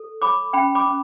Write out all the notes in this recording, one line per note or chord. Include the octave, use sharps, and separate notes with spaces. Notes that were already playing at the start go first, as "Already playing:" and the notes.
Already playing: A4
C#5 B5 D6
C#4 G5 B5
B5 D6
C#4